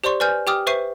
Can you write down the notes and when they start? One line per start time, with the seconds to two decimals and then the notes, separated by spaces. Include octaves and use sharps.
0.04 G4 C5 D5 C6 C#6
0.20 B4 D5 G#5 F6 G6
0.47 G4 G5 D6 D#6 F6
0.67 B4 C5 E5 C#6 C7 D#7